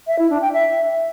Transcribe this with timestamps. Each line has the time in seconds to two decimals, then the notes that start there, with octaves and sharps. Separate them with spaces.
0.07 E5
0.19 E4
0.30 D4
0.42 G5
0.53 E5